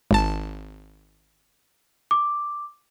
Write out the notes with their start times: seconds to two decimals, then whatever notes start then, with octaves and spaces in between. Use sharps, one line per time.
0.11 G#1 A5
2.11 D6